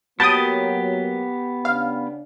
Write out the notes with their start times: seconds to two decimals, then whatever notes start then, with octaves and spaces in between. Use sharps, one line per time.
0.20 F#3 A#3 B3 G4 G5 A5 D#6
1.65 C#3 D4 F5